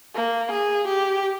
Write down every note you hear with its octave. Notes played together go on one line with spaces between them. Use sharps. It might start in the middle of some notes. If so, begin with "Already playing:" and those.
A#3
G#4
G4